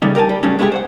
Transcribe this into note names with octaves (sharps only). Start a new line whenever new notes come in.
C#3 G3 A3 C#4 D#4
G4 A#4 F#5 G#5 A5
G3
A2 C#3 F#3 G3 C#4 D4
G#3 A3 C#4 E4 G4 G#4
C5 C#5 F#5